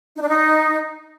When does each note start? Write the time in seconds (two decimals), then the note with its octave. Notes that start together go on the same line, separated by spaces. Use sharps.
0.16 D#4
0.22 D4
0.28 D#4